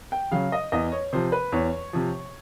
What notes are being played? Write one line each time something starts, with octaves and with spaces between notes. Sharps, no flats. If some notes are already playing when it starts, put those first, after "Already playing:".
G5
C#3 F#3 F5
D#5
E2 D#5
C#5
C3 F3 C5
B4
E2 C#5
C3 F3